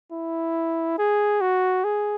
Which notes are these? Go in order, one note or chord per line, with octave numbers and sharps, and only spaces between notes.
E4
G#4
F#4
G#4